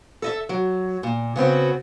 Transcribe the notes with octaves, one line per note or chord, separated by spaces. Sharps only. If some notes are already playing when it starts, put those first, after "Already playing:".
A4 D#5 E5
F#3
A#2
C#3 B3 C4 F#4